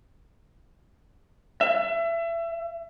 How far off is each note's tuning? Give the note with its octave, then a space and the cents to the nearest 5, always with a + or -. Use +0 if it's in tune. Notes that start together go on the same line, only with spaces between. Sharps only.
E5 +30